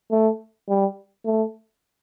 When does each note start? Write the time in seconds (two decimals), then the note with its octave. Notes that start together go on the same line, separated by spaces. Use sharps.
0.11 A3
0.69 G3
1.25 A3